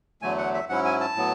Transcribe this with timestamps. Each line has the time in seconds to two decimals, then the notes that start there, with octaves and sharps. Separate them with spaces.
0.22 E2 D3 F#3 A3 G#5
0.38 F#5
0.54 E5
0.69 G#2 F#3 C#4 E4 F#5
0.85 G#5
1.00 A5
1.15 A2 F#3 B3